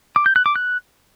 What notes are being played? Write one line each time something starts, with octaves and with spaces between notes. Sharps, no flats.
D6
G6
F#6
D6
F#6